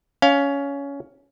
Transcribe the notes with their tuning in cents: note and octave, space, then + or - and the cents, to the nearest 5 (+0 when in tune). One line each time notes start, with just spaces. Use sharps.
C#4 +15 F5 +0